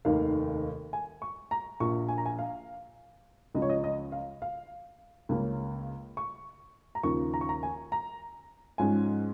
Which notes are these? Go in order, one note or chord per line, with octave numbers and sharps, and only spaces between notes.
F1 D#2 D#3 A#3 F5
G#5
C#6
A#5
A#1 A#2 F3 C#6
G#5
A#5
G#5
F5
C#2 C#3 F3 C#4 D#5
C#5
D#5
D#5
F5
F5
C#2 C#3 A#3 C#4
C#6
A#5
D#2 C#3 F3 C#6
A#5
C#6
A#5
G#5
A#5
G#2 F3 G#3 C#4 G#5